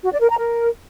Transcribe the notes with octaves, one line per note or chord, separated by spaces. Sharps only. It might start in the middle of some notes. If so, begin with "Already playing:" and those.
F#4
D5
A#4
A#5
A#4